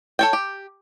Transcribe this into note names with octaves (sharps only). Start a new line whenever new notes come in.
A4 C#5 G5
G4